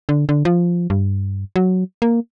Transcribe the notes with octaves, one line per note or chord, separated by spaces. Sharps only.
D3
D3
F3
G2
F#3
A#3